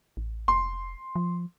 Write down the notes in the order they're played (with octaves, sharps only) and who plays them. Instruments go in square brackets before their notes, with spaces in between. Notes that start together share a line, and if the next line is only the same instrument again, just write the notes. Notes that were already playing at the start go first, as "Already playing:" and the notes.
[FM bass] A1
[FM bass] F1 [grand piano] C6
[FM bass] F3